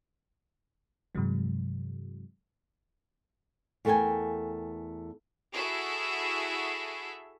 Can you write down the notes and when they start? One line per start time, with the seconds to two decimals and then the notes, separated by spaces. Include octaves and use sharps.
1.15 G2 C3 E3 F#3 G#3
3.85 E2 A3 A4 A#4 G5 G#5
5.54 E4 F#4 G#4 A4 E5